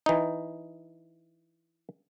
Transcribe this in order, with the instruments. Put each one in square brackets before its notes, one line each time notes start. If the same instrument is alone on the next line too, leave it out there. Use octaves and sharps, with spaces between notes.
[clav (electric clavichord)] E3 D#4